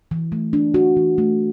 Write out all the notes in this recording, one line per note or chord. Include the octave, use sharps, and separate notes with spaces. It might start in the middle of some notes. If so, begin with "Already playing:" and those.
E3
A3
D4
F#4
E3
A3